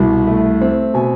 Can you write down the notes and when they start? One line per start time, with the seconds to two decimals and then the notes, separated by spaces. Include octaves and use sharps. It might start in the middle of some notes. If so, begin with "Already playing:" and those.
Already playing: C2 B2
0.27 A3
0.61 C4
0.94 B2 G#5